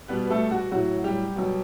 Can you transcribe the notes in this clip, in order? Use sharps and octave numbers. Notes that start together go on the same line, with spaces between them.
B2 G3 B3 B4
B4
A3 A4
F#4
A2 F#3 F#4
G3 G4
B2 F#3